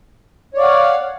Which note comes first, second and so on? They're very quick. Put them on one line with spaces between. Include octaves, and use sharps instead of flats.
C#5 D5 F5 F#5